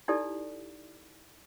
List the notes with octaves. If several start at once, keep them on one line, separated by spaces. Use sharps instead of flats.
D#4 E4 G4 A4 D5